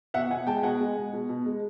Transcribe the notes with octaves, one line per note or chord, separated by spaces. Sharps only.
B2 E5 F#5
B2 F#5 G#5
G#3 G5 A5
B2 F#5 G#5
G#3
G#3
B2
B2
G#3